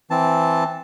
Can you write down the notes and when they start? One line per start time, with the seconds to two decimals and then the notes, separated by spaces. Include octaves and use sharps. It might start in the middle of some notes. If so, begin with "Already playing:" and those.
0.11 E3 C4 A5